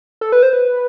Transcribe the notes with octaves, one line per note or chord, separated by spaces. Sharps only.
A4
B4
C5
B4